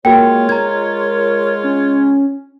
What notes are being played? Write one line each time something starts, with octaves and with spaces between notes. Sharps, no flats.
G#3 A#3 F4 F#4 A#4 C#5 G5
A#4 A#5 G#6
C#4